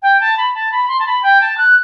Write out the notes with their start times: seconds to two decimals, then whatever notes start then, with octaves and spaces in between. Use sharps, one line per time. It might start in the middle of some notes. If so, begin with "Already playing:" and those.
0.02 G5
0.20 A5
0.38 B5
0.55 A5
0.72 B5
0.88 C6
0.99 A5
1.06 B5
1.23 G5
1.41 A5
1.58 F#6